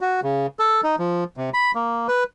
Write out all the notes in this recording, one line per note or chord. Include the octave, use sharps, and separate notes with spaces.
F#4
C#3
A4
D#4
F3
C3
B5
A#3
B4